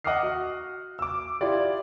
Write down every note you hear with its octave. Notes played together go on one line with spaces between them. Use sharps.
D#5 F#5 D6 D#6 F6 C7
F#4
D6 E6
E4 F4 G4 D5